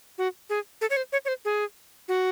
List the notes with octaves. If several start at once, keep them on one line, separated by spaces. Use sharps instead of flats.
F#4
G#4
A4
C#5
C5
C#5
C#5
C5
G#4
F#4